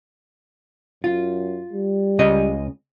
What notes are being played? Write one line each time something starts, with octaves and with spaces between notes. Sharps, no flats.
F#2 F4
G3
C#2 C#3 D#5